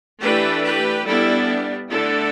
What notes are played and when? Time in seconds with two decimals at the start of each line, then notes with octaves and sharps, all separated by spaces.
0.21 E3 A3 D4 G4 B4
0.63 G4 B4
1.06 G3 B3 D4 E4 A4
1.90 D3 A3 D4 E4 A4